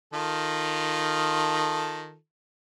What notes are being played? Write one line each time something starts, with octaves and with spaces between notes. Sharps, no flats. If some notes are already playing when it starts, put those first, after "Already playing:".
D#3 F4 A4